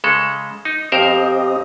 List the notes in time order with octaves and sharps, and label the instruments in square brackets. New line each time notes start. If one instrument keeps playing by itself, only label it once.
[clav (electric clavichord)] C#3 G#3 A4
D#4
[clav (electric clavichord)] F2 A#4 C5 [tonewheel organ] C4 G4 D#5